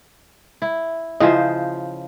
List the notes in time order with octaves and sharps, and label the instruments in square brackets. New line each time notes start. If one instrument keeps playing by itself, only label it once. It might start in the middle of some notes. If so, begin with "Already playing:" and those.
[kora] E4
[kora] C#3 F3 C5 [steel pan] E4 D#5